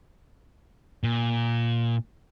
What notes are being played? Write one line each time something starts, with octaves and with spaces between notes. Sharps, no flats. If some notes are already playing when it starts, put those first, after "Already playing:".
A#2